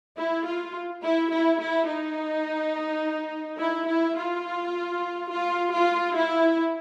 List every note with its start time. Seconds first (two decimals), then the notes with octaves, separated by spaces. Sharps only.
0.17 E4
0.45 F4
1.02 E4
1.31 E4
1.60 E4
1.87 D#4
3.58 E4
3.87 E4
4.15 F4
5.29 F4
5.72 F4
6.15 E4